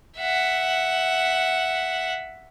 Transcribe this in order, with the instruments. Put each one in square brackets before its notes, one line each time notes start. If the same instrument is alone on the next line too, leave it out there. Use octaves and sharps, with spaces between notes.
[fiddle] E5 F#5